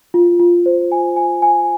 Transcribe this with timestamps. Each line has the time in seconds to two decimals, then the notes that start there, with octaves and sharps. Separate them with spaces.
0.14 F4
0.40 F4
0.66 C5
0.92 G#5
1.16 G#5
1.42 G#5